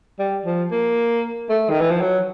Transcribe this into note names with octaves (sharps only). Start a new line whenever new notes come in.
G3
F3
A#3
A3
D#3
E3
F3
F#3